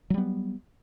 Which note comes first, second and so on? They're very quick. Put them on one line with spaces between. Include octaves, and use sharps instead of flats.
F#3 G3 B3